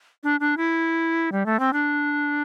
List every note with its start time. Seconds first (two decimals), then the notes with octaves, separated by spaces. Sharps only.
0.23 D4
0.40 D4
0.57 E4
1.32 G3
1.46 A3
1.60 C4
1.73 D4